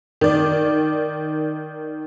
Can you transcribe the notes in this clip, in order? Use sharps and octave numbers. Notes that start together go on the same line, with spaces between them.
D#3 D5